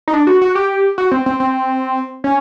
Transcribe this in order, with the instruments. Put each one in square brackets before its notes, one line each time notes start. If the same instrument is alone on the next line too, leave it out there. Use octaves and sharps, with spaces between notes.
[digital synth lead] D#4
D4
F#4
F#4
G4
F#4
C4
C4
C4
C#4